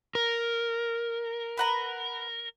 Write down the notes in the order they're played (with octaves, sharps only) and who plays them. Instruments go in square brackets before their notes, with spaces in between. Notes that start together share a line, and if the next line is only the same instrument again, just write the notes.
[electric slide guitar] A#4
[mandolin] B4 F#5 A#5